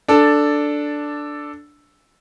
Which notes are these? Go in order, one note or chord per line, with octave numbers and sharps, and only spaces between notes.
D4 A4